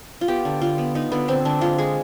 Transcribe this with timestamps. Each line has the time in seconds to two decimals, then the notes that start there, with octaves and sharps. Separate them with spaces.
0.21 F4
0.28 B3 G4
0.45 D3
0.62 D3 F4
0.78 B3
0.95 B3 D#4
1.12 D3 B3
1.28 D3 C4
1.45 D3 D4
1.61 G#3 F4
1.78 G#3 G#4